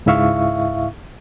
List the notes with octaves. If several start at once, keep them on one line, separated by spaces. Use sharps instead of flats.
C#2 G#2 E4 E5 F5 C#6